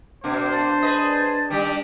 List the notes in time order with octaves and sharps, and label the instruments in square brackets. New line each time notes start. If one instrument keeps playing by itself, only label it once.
[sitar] B2 A#3 [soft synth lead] D4 [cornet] C5
[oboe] A5
[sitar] G#4 B4 D#5
[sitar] D#3 G3 [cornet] G4